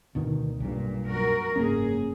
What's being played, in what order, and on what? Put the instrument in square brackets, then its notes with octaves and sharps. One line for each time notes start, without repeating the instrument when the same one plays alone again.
[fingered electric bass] D2 B2 D#3
[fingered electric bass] B1 G2 [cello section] A#2
[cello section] F#2 F#4 A#4
[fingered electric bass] F#1 A#3 C#4 [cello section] G#2 G#4